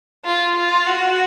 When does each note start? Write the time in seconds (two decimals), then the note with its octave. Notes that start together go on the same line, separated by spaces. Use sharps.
0.25 F4
0.56 F4
0.87 F#4